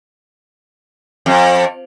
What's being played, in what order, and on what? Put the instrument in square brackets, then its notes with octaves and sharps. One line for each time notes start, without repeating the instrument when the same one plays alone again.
[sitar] F2